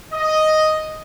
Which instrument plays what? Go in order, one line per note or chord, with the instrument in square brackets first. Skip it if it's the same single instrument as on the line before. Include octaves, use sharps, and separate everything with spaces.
[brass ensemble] D#5